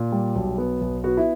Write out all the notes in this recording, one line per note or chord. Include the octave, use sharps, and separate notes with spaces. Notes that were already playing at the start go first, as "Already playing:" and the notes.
Already playing: A#2
G3
B1
B3
B1
B3 F#4
E4